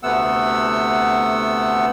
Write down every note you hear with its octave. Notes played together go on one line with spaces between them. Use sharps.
D2 C3 A3 B3 F#5 E6